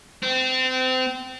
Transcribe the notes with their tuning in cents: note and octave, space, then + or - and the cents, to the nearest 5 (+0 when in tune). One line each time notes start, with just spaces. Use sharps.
C4 -25